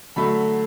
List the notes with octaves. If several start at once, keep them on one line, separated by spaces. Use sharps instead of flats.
D3 F#3 A3 B5